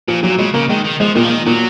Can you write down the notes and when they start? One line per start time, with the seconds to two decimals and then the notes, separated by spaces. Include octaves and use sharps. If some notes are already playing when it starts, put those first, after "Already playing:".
0.08 A#2 F3
0.23 A#2 F#3
0.38 C#3 G#3
0.54 C#3 A#3
0.69 D#3 G#3
0.85 D#3
1.00 F3 G#3
1.15 A#2 D#3
1.24 F3
1.31 D#3
1.46 A#2 F#3